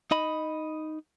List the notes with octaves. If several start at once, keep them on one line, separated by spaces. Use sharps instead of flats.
D#4 D#5 B5